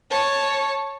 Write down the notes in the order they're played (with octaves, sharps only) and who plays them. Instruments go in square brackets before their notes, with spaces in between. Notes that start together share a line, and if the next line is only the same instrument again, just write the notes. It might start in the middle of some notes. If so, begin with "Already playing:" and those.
[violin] C#5 A5